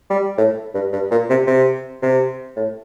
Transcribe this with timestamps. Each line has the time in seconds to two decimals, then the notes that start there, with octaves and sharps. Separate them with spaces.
0.10 G3
0.38 A2
0.74 G2
0.93 G2
1.11 A#2
1.29 C3
1.47 C3
2.02 C3
2.57 A2